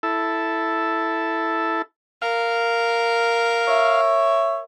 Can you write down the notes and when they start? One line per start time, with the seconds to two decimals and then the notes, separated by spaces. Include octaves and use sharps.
0.03 E4 A4
2.22 A#4 F5
3.67 C#5 E5